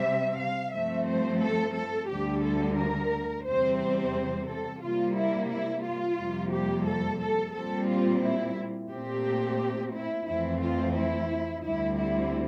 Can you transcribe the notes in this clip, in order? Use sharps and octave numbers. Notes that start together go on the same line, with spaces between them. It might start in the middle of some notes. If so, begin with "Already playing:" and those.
Already playing: C3 G3 C4 E5
F5
G2 F3 A3 C4 E5
C5
A4
A4
D2 D3 G3 G4
A4
A#4
E2 C3 G3 C4 C5
C5
A4
C3 G3 A#3 F4
E4
E4
F4
F2 C3 G3 A#3
G4
A4
A4
A#2 G3 C4 A4
F4
E4
A#2 A3 C4 G4
E4
F2 E3 A3 C4 E4
F4
E4
D2 D3 G3 C4 E4
E4